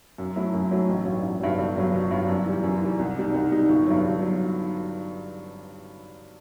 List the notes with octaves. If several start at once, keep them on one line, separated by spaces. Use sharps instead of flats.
F#2
F#3 A3 E4
F#2
F#3 A3 E4
A1
G2 F#3
A1
G2 F#3
G1
G2 F#3
G1
G2 F#3
F#2
E3 G3
F#2
E3 G3
C2
B2 G3 D#4
C2
B2 G3 D#4
G1
G2 F#3
G1
F#3